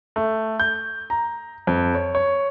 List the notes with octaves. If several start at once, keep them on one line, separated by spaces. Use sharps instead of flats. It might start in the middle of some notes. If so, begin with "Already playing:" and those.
A3
G6
A#5
F2
C#5
C#5